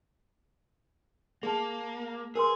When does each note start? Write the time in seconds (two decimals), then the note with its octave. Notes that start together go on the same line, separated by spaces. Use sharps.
1.43 A#3 G#4 A5
2.36 G#4 A#4 B4 C6